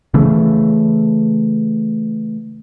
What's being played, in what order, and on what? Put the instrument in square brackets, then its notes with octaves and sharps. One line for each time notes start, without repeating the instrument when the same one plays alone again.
[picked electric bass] C#3 E3 A3